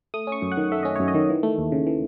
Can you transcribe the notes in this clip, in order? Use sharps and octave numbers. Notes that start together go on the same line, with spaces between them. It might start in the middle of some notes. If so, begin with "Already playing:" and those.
A3 D#6
C#4
C#6
F#2
F#5
D#3
A3 E5
C#4 D#5
F#2 C#5
D#5
D#3
E3
A3
D#2
C#3
E3